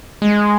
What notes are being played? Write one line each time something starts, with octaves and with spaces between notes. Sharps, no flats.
G#3